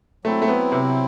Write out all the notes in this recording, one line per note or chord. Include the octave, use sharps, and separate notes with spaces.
F#3 A3 C4 E4
A3
B3
C3